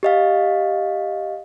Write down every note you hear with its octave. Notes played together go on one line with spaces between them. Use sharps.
G4 D#5 F5